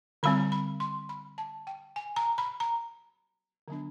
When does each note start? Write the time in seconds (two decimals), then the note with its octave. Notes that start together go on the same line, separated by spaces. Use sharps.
0.23 D3 G3 C4 B5
0.52 B5
0.80 C6
1.09 B5
1.38 A5
1.67 G5
1.96 G#5
2.16 A#5
2.38 B5
2.60 A#5
3.68 D3 F#3 B3 D4